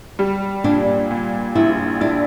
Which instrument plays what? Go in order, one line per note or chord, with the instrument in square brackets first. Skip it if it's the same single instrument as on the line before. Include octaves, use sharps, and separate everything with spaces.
[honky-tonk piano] G3
[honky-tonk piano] A#2 [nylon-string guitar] D4
[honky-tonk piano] A#2
[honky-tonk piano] A#1 [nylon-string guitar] E4
[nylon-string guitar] D4 [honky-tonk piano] E4